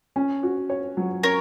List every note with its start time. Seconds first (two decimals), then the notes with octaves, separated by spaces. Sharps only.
0.16 C#4
0.43 F#4
0.70 C#5
0.97 F#3
1.23 C#4 A#4 C#5